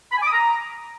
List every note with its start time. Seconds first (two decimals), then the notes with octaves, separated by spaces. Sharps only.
0.12 B5
0.17 G#5
0.22 D6
0.27 D#6
0.32 A#5